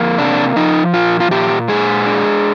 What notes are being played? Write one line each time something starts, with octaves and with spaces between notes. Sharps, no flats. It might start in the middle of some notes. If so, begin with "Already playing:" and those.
Already playing: F2 A#3
C3 D4
F3 D#4
A#2 F4
F4
A#2 G4
G#3 G#4
D4